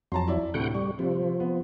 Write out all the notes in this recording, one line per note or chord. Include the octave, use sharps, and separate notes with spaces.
F2 F#3 A5 A#5 C6
E4 D5 E5
D2 A2 C3 F#5 G5
G3 C#6
C3 F3 G3
B3